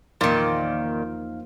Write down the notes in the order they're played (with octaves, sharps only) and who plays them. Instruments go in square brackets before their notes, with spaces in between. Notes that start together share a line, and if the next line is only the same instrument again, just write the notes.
[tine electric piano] E2 D#4 F5 [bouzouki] A#2 D#3 [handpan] F3 A#3